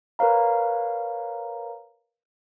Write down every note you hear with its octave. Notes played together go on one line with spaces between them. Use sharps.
A#4 B4 C#5 F5 A#5